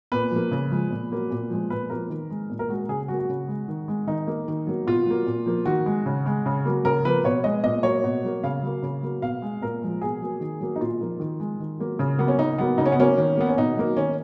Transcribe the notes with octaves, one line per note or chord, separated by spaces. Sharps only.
A#2 B4
F3 A#3
C#3
F3 G#3
A#2
F#3 A#3
A#2
F3 G#3
A#2 B4
F3 A#3 A#4
D#3
G#3
A#2
A#4
G#3 F#4
C#3 G#4
F#3 A#3 F#4
F#4
C#3
G#3
D#3
G#3
D#3 D#4
A#3
D#3
F#3 A#3
B2 F4
F#3 A#3
A#2
F3 A#3
D#3 F#4
G#3
C#3
G#3
C#3
F#3 A#3
C#3 A#4
F3 A#3 B4
B2 C#5
G#3 D#5
A#2 D#5
F#3 A#3 C#5
B2
F#3 A#3
C#3 F5
F#3 A#3
C#3
F#3 A#3
B2 F5
G#3
A#2 A#4
F3 G#3
B2 G#4
F#3 A#3
D#3
F#3 A#3
D#4
A#2 F4
F3 A#3
D#3
G#3
D#3
F#3 A#3
C#3
F#3 A#3 B3
C#4
C#3 D#4
F#3 A#3 B3
C#3 D#4
C#4
B3
F#3 A#3 C#4
D#3
A#3 B3
C#4
B2 D#4
F#3 A#3
D#3 C#4